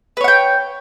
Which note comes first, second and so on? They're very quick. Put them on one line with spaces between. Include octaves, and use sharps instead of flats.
B4 C#5 F#5 G5